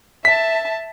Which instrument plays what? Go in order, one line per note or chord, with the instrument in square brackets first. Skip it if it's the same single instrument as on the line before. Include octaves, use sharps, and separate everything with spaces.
[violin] E5 A5 [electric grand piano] B6